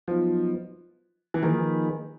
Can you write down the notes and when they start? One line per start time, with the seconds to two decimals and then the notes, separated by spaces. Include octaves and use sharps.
0.08 F3 F#3 B3 D#4
1.34 E3
1.42 D#3 F3 A#3 D#4 G#4 B4